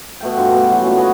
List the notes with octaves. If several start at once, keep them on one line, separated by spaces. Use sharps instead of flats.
B2 A3 G5
G2 F4 G4
B2 A4
E3 F#3
A#2 A3 C#4
F#4 G#4 B4 D#5